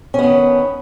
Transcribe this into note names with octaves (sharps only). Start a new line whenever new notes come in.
D#3 B3 C#4